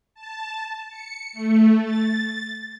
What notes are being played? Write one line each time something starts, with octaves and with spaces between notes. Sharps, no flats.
A5
C#7
A3
A6